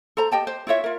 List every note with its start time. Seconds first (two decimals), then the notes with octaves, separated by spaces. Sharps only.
0.17 A4 C5 A#5
0.32 G4 D#5 G5 A5
0.47 C5
0.67 E4 F4 C#5 E5
0.84 F4 A#4